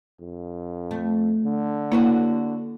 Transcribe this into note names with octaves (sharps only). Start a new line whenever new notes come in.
F2
A3
D3
A#3 E4 F#4 B4 C#5